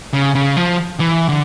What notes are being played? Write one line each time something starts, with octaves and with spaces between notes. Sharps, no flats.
C#3
C#3
F3
E3
D3